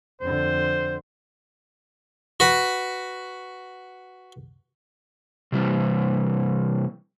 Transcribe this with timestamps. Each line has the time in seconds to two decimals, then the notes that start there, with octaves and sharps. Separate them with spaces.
0.21 F2 D3 C5
2.40 F#4 B4
5.52 C3 E3 G3